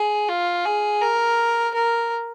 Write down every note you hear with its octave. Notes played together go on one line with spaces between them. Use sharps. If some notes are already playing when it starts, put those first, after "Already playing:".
Already playing: G#4
F4
G#4
A#4
A#4